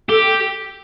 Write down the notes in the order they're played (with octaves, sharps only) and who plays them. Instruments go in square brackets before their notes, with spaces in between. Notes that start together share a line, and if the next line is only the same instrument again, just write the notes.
[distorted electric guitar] G4 [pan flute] A4